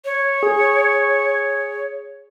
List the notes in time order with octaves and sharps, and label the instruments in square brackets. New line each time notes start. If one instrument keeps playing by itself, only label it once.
[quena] C#5
[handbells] G#4